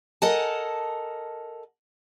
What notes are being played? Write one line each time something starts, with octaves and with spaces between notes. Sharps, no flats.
A4 A#4 D#5 F#5 G#5 A5